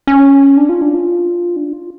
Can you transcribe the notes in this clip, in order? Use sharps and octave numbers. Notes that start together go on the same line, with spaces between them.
C#4
D4
F4
D4
F4
D4
F4